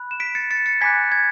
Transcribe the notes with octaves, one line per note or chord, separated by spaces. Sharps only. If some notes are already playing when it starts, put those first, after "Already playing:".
Already playing: B5 F#6
E7
B6 D7
A6 C#7
A6 C#7
A6 C#7
G#5 B5 D6 F#6 G#6 B6
G#6